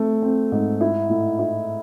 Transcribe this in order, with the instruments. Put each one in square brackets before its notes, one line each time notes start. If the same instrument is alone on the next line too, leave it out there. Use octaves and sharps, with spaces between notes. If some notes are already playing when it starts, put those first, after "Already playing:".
Already playing: [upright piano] A3 C4
C4
G#2
E4
A2
E4